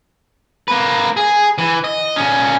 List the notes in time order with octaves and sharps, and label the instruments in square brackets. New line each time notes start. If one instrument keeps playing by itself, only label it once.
[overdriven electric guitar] A#3 B4
G#4
E3
D#5
A#2 C#4